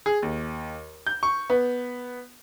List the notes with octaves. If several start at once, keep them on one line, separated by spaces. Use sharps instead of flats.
G#4
D#2
G6
C#6
B3